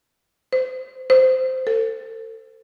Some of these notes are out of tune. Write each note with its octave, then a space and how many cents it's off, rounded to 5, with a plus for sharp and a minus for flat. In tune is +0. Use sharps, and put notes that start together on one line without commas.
C5 -25
C5 -15
A4 +35